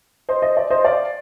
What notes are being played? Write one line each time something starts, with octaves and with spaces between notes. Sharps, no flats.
C5 D#5
C5 D#5
D5
C5 D#5
D5 F5